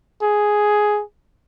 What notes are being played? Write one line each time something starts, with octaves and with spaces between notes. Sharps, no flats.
G#4